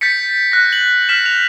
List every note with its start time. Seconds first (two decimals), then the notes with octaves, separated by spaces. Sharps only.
0.01 G6 A6 B6 C#7
0.52 F#6 A#6
0.72 F#7
1.09 F6 B6 E7
1.26 F7